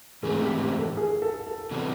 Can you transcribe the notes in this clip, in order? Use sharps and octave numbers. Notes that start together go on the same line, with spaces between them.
G#2 E3 A3 C4 G#4
G4
G4
A4
G#4
A4
A4
C3 E3 G3 B3